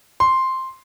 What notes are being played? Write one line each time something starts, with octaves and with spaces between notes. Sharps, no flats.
C6